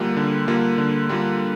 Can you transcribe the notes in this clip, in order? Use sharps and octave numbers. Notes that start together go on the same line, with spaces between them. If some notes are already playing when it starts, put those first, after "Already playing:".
Already playing: D3 G3 A#3 F4
D3
G3 A#3 F4
D3
G3 A#3 F4